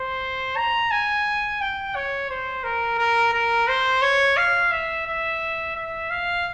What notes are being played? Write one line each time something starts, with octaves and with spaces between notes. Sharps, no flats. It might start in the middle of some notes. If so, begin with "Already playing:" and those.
Already playing: C5
A#5
G#5
G5
C#5
C5
A#4
A#4
A#4
C5
C#5
F5
E5
E5
E5
F5